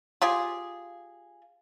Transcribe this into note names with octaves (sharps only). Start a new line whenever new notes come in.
F4 G4 G#4